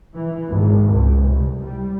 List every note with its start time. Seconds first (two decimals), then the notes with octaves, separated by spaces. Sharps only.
0.14 E3
0.48 G#1
0.92 C#2
1.25 C2
1.64 G3